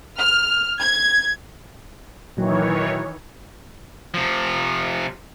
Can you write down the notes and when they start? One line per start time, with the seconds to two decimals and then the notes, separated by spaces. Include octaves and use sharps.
0.17 F6
0.80 G#6
2.37 A#2 D#3 E3 F#3 C#5
4.14 C3 F3